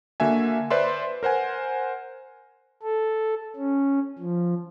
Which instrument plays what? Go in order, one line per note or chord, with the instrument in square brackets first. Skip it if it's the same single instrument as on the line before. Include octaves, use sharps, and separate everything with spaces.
[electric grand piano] D3 A#3 F#4 E5 G#5
B4 C5 D5 E5 C6
A#4 C5 F#5 G#5
[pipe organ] A4
C#4
F3